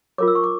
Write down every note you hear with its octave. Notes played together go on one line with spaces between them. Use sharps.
F4 A#4 C#5 D6
E6
C#6
D6